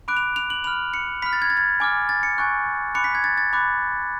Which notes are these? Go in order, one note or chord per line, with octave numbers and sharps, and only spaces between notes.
B5 D6 F#6 D7
F7
F7
F#7
B5 F6 F7
C#7
B5 F6 B6
A6
G#6
A6
G#6
G#5 D6 F6
A6
C#7
G#5 C#6 F#6
B5 D6 F#6 C#7
B6
G#6
A6
A6
B5 D6 F#6